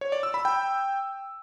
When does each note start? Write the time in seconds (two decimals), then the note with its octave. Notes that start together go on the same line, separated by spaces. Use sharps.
0.01 C#5
0.12 D5
0.23 E6
0.34 B5
0.45 G5